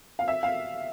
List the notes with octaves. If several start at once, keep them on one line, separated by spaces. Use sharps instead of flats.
F5
E5
F5